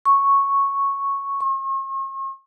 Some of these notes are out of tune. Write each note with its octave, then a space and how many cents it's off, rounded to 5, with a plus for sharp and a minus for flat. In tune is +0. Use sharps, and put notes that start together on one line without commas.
C#6 -5
C#6 -45